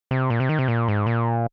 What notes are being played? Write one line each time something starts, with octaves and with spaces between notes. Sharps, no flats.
C3
A#2
C3
D#3
C3
A#2
G#2
A#2